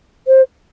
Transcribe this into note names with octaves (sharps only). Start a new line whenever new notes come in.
C5